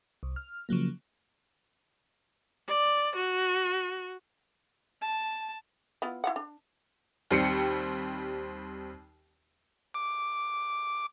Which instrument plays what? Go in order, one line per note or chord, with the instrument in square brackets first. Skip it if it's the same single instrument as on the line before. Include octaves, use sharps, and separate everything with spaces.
[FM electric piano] C2
F6
C#3 F3 F#3 A#3
[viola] D5
F#4
[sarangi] A5
[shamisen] B3 E4 F4
E4 F5 F#5
D4
[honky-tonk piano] D#2 G3 C4 C7 C#7
[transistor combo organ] D6